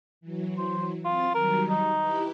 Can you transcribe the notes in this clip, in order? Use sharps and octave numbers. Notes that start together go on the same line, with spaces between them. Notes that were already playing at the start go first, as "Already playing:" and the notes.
E3 F#3
C5
C4 F4 A6
D#3 F#3 G3 A#4
D#4
E4 G4 B4